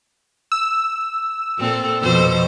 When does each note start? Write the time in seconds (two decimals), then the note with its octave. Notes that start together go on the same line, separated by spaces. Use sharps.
0.52 E6
1.58 A#2 C4 A4
2.02 F2 B2 C5